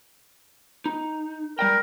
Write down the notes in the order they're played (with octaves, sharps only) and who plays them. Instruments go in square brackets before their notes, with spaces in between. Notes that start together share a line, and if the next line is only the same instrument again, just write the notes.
[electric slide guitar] D#4
[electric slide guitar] G3 D5 G5 [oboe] A#4